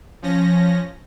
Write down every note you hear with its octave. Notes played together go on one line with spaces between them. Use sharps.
F3 C#4 A#6